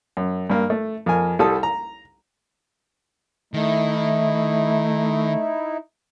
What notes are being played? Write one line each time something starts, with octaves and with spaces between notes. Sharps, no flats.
F#2
G2 A#3
A3
F2 A#4 G#5
C2 G3 A4 A5 D#6
A#5
D#3 A3 D#4 E4